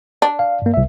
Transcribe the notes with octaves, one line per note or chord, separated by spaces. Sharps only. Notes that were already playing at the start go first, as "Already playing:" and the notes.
D4
F5
G2 A#3
C2 E5